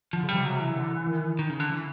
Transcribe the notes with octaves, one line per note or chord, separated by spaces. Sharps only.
D3 F3
C#3
C3 G3
C#3 F#3
E3
D3
D#3
D#3
C#3
D3
E3